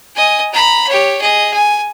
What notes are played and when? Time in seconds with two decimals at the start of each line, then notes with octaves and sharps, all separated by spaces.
0.15 D#5 G#5
0.52 A#5 B5
0.88 G4 C#5
1.21 G#4 D#5
1.54 G#5